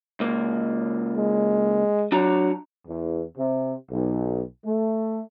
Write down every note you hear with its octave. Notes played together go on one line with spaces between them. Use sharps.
C#2 A#3
G#3
F#3 D4 F#4 A#5
E2
C3
B1
A3